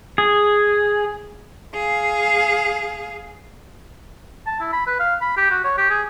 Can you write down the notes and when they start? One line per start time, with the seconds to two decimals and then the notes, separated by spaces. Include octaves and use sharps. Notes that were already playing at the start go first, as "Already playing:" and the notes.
0.18 G#4
1.74 G#4 F5
4.47 A5
4.60 E4
4.73 B5
4.87 B4
4.99 F5
5.21 B5
5.37 G4
5.51 F#4
5.65 C#5
5.78 G4
5.90 G#4